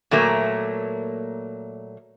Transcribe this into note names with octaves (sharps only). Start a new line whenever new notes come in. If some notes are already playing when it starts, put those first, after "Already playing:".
A#2 F#3 A3 A#3